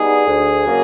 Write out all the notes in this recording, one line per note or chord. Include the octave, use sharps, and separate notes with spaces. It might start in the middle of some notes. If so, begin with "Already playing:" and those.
Already playing: G3 B3 D#4 G#4
D2
C#3 F#3 A#3